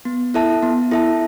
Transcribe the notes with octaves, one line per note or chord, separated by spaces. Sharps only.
B3
E4 A4 E5 A5
B3
E4 A4 E5 A5